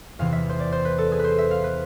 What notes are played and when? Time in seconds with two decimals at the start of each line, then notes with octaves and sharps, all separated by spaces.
0.19 E2 C3 E3 F5
0.33 E5
0.50 C5
0.60 D5
0.72 C5
0.85 B4
0.98 A4
1.12 G#4
1.19 B4 C5
1.38 E5
1.51 F5
1.64 B4